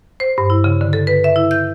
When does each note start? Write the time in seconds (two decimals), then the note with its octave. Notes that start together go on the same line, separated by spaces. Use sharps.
0.20 C5
0.38 G2
0.50 E4
0.64 C#3
0.81 D3
0.93 A4
1.07 B4
1.24 E5
1.36 E4
1.51 G6